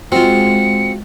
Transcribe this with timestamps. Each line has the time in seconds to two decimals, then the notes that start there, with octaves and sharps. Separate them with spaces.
0.12 G#3 C4 F4 F#4 C#7